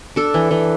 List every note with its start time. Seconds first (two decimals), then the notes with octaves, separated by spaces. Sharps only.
0.16 D4 A4
0.34 E3
0.51 E3